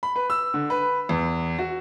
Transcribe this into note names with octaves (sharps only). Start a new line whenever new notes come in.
B5
B4
E6
D3
B4
E2
F#4